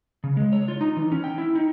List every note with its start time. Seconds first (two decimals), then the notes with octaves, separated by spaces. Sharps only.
0.24 C#3
0.37 G#3
0.52 C#5
0.68 F4
0.81 D#4
0.97 E3
1.12 C#4
1.24 G5
1.38 E4
1.55 D#4